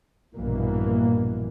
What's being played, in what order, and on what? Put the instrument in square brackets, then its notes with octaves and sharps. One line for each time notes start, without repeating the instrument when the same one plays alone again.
[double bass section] A#1 G2 B2 E3 A#3